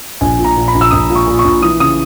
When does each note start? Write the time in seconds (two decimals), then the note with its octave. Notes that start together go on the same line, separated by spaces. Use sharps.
0.21 A#1 G#5
0.39 A#2
0.44 A#5
0.57 A#2
0.68 B5
0.74 A#1
0.81 E6
0.91 A#1 D#6
1.09 A#2
1.15 C#6
1.27 A#2
1.39 C#6
1.44 A#1
1.62 E3 D#6
1.80 C#3 D#6